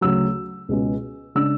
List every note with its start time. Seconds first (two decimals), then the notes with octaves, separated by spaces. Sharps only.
0.01 D2 C#3 F#3 E6
0.69 C#2 B2 G#3 C#4
1.35 C#3 G#3 D4 E6